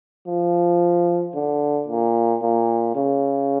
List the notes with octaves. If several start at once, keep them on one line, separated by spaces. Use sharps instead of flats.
F3
D3
A#2
A#2
C#3